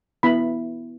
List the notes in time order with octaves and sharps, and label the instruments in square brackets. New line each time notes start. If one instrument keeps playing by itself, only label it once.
[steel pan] B3 E4 B5